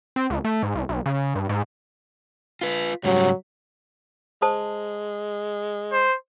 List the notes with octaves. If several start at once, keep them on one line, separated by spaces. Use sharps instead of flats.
C4
C#2
A3
G#2
C2
B1
C#3
G2
G#2
F4 B4
G#2 C#3 F#3 G3
G#3 C5 A5 D#6
C5